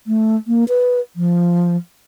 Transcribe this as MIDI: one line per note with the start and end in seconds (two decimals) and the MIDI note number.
0.07 0.36 57
0.47 0.64 58
0.69 1.00 71
1.16 1.77 53